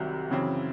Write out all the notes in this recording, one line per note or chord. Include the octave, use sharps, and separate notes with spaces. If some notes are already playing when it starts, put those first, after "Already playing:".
Already playing: C2 C3 D#3 F#3 C4
F#2 C#3 E3 C4